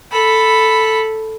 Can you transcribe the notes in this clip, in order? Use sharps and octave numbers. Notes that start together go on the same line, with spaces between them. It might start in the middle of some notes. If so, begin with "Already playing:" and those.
A4 B5